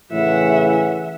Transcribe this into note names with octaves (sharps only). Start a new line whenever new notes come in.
A2 C#3 E3 E5 F#5